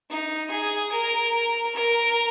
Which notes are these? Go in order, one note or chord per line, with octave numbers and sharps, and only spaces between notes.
D#4
G#4
A#4
A#4